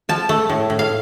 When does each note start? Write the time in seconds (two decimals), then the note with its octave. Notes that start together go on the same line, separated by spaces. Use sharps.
0.09 F3 A5
0.29 A3
0.50 A2
0.70 A2
0.79 F5